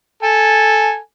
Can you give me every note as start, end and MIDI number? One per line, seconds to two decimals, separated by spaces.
0.23 0.97 69
0.23 0.97 80